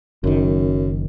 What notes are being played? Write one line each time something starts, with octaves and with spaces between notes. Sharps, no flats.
F#1 F#2 D#3